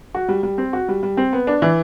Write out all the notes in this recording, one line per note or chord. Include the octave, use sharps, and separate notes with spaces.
F#4
G3
G3
C4
F#4
G3
G3
C4
B3
D4
E3